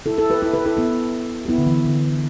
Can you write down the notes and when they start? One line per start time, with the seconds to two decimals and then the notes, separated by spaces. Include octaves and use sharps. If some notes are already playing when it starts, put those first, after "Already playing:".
0.06 E4 A4
0.18 E4 A4
0.30 G4 B4
0.42 E4 A4
0.54 G4 B4
0.66 E4 A4
0.77 B3 E4
1.45 G4
1.49 B3 E4
1.58 D3
1.66 E3
1.85 D3